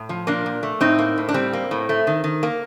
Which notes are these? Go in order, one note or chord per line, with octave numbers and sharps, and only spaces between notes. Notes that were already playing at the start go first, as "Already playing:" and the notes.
Already playing: A2
F3
A#2 A#3 D4
A#2
A3
A2 C4 D#4
A#3
A2
D4
G3 C4
A#3
A2
A3
D#3
D#3
A#3